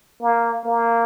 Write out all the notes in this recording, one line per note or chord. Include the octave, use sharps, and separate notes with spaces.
A#3
A#3